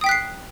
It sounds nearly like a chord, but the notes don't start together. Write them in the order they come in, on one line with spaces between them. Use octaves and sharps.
D#6 G5 B6 F#6 C7